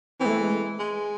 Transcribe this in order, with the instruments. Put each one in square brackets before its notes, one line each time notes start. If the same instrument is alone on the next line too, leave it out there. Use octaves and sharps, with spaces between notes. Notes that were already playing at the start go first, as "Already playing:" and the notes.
[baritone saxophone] E3 [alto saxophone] C4
[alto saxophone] G#3
A3
G#3
[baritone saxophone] G#3